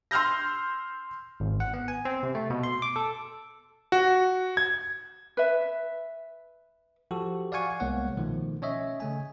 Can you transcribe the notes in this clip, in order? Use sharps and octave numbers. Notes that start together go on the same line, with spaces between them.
C6 E6 F6 G6 A#6
G#1
F#5
B3
G#5
C4
C3
A3
B2
C6
D6
A4
F#4
G#6
B4 E5
F3 F#4 G4 A4
D5 F5 F#5 G#5 C#6
C2 G#3 A#3 B3 C#5 F#5
B2 D#3 F3 A3
C#4 C#5 D#5 E5
C#3 A3 G#5